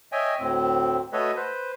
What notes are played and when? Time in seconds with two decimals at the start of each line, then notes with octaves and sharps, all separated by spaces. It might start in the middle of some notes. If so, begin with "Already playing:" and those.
0.12 C#5 D#5 E5 G5 G#5
0.39 D2 A2 C4
1.13 A3 F#4 A4 B4 C#5 D#5
1.36 B4 C5